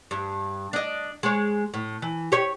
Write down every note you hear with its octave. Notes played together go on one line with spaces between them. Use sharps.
G2
D4 D#5
G#3 C#5
A2
E3
G4 C#5